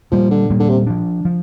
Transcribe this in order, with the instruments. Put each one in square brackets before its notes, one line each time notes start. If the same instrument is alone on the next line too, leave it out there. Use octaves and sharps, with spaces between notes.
[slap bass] A#2 G3 A#3 [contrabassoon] F3
[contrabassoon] D3
[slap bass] A#2 G3 A#3
[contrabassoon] D3
C3
[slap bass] F3 D4
F3